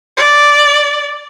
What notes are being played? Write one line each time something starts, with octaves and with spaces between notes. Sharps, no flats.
D5